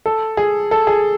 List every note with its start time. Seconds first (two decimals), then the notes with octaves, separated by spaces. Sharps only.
0.06 A4
0.37 G#4
0.71 A4
0.87 G#4